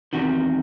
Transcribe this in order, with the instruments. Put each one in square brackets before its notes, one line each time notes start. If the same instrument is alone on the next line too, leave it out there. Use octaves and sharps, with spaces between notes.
[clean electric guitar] E2 C3 D#3 F#4